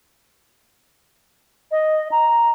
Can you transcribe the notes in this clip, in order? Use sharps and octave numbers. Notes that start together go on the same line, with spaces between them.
D#5
A#5